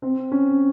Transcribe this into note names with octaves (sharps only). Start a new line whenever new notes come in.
C4
C#4